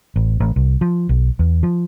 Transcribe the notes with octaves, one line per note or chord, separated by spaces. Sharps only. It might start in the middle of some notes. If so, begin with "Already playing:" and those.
A1
A1
C2
F3
B1
E2
F3